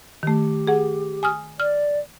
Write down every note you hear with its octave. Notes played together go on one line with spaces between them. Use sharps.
D#3 A3 G4
G#4 F#5
G#5 D#6 F6
D5 F6